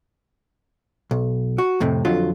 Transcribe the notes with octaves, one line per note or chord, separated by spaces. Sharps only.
B1
F#4
F2 A2 C3
F2 D3 F#3 F4